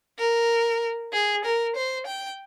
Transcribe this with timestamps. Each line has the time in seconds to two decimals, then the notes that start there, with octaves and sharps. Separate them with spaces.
0.19 A#4
1.13 G#4
1.45 A#4
1.76 C5
2.07 G5